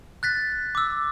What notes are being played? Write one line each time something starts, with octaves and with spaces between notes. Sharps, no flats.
F#6 A6 B6
D6 E6